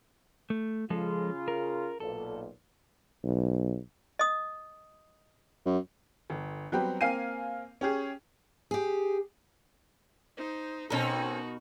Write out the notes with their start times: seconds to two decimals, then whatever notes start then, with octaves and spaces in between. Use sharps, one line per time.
0.50 A3
0.90 C#3 F3 G#3 F4 A4
1.48 A#4
2.00 B1 A#2 A4
3.24 B1
4.19 D#5 D#6
5.66 F#2
6.30 G1
6.72 F#3 G3 B3 C4 G4
7.01 A#3 C4 F5 G#5 C7 D#7
7.81 C#4 G4 G#4
8.71 G4 G#4
10.37 D#4 C5
10.90 B2 C4 C#4 D#4 F#4 A4 A#4